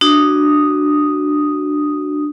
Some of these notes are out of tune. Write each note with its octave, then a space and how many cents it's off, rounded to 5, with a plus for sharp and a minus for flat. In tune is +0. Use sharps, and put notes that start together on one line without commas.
D4 +10 F#4 +0 D#6 +0